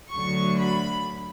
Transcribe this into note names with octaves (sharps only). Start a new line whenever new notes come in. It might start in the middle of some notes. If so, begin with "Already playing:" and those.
D2 D3 F#3 C#6
B5